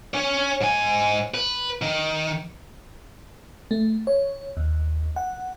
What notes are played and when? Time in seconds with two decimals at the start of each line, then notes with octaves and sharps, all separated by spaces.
0.14 C#4 C#5
0.61 G#2 G#5
1.34 B4
1.82 D#3
3.71 A3
4.07 C#5
4.57 D#2
5.16 F#5